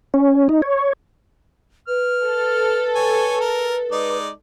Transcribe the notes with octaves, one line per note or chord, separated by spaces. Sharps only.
C#4
D#4
C#5
B4 F6
A4
C#5 G#5
A#4
G#3 D#4 D5